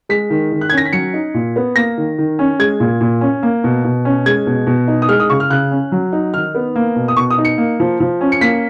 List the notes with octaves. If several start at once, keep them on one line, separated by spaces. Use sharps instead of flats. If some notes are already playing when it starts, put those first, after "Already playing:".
G#3 B6
D#3
D#3
F#6
C#4 G#6
A#6
B6
F#3 C#7
D#4
A#2
B3
A#3 A#6
D#3
D#3
C#4
G#3 G#6
A#2
A#2
C#4
A#3
B2
B2
C#4
G#3 G#6
B2
B2
D#4
D#6
G#3 F6
D#6
C#3 C#6
F6
C#3 F#6
C#4
F#3
D#4
D#3 F6
B3
A#3
B2
D#6
B2 C#6
D#6
D#4
C#7
A#3
F3
F3
C#4
C#7
A#3 B6